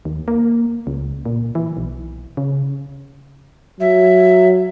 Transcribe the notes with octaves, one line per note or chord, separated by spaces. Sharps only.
D#2
A#3
C#2
A#2
E3
B1
C#3
F#3 E5